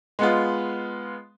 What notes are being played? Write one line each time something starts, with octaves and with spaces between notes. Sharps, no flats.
G#3 B3 F4